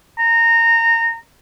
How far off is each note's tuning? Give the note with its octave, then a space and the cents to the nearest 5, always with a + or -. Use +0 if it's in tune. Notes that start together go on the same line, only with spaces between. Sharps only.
A#5 -20